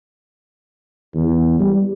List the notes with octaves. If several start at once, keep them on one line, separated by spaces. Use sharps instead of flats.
E2
G3